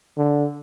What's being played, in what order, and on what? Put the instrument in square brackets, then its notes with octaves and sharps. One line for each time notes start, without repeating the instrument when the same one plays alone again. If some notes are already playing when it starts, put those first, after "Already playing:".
[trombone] D3